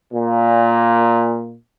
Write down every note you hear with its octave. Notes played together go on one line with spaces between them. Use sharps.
A#2